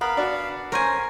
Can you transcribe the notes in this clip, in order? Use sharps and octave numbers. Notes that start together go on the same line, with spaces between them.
B3 A#4 F5 B5
D4 F#4
C#4 A#4 C5 G#5